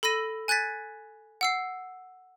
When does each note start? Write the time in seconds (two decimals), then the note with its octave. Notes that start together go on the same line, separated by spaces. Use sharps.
0.03 A4 B5 E6 A#6 D#7
0.48 G#5 F#6 G#6 A6 B6
1.41 F#5 E6 C7